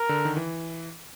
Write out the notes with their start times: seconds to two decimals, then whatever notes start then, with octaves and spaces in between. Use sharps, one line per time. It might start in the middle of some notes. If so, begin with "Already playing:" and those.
Already playing: A#4
0.09 D3
0.25 D#3
0.37 E3